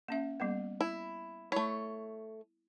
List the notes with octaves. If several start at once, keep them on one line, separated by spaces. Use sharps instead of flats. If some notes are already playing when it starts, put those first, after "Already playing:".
A#3 C#4 E5
G3 A#3 B3
E4
A3 E4 C#5